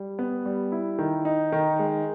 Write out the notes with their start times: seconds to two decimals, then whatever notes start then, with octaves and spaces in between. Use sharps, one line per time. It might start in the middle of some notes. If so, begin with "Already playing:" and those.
Already playing: G3
0.19 B3
0.46 G3
0.72 E4
0.99 D#3
1.25 D#4
1.52 D#3
1.79 G#3